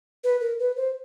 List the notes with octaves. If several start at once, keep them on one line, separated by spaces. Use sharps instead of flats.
B4
A#4
B4
C5